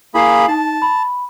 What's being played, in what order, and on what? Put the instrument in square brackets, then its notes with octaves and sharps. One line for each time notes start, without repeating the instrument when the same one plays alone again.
[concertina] A#3 G#4 B5 [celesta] E4 C7
[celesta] D#4 [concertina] A5
[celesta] B5